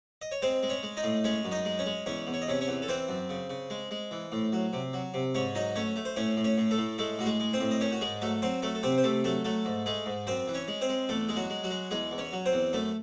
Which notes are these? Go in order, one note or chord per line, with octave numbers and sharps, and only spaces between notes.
D#5
C#5
G#3 C4 C5
G#3
C#4 C#5
G#3
D#4 D#5
A2
G#3 C#4 C#5
F#2
D#4 D#5
G#3
C#4 C#5
G#3
E2 C#4 C#5
E2
C#5
D#5
C3 C#4 C#5
C#4 C#5
E2
A4
E3 C4 C5
F#2
C#3
C#3
G#3
G#3
E3
A2
F#3
C3
F#3
C3
G#2 C#4 C#5
F#3 D#4 D#5
A3 C#4 C#5
A3
C5
A2 C#4 C#5
A2
C#4 C#5
A2
A3 A4
A2
G#3 A3 A4
A2 F#4
G#3 G#4
G#3
C4 C5
A2
D#5
D#3 C#4 C#5
F#4
G#2 G#3 G#4
F#3 A3 A4
F#3 C4 C5
F#3 A3 A4
A4
C3 C4 C5
C5
C3 A3 A4
F#3 A3 A4
F#3 A3 A4
G#2
G#3 A3 G#4
G#2
F#2 C4 C5
E3
C#4 C#5
G#3
C4 C5
G#3
E2 A3 A4
G#3 G#4
F#3 F#4
G#3
F#3 F#4
G#3
E2 G#3 G#4
E2
C#4 C#5
F#3
C4 C5
E2
F#2 A3 A4